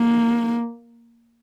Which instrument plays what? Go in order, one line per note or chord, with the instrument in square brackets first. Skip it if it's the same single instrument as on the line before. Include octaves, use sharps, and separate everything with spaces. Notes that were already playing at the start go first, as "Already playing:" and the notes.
Already playing: [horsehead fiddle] A#3